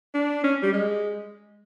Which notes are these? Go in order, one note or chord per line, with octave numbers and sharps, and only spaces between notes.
D4
C#4
G3
G#3